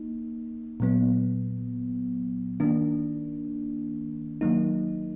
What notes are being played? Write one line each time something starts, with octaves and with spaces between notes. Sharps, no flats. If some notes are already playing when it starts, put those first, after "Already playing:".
Already playing: A#3 D#4
A#2 F#3 B3
D#3 A#3 D4
D#3 F#3 A#3 D#4